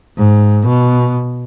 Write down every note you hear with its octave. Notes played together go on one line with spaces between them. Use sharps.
G#2
B2